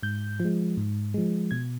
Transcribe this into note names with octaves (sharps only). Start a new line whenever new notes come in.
G#2 G6
F3
G#3
G#2
F3 G#3
B2 G#6